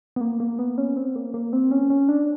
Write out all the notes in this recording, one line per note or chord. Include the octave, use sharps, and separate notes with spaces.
B3
A#3
A#3
B3
C#4
C4
A#3
A#3
C4
C#4
C#4
D4